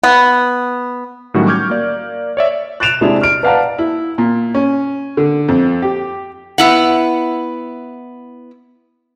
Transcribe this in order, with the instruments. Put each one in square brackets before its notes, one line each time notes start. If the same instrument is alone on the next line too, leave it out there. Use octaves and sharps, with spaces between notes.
[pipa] B3
[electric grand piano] A2 D#3 F#3 G3 C#4 F#4
C#6 D6 F6 G6 G#6
A#3 D5
C#5 D5 E5
[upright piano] F#6 A6 D7 E7 F7
C3 G#3 D4 E4 G#4
F6 D7
B4 D5 F5 F#5 A5 A#5
[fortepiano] E4
A#2
C#4
D3
F2
G4
[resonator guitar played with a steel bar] B3 E4 F#5